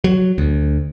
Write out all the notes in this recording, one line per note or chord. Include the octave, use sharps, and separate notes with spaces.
F#3
D2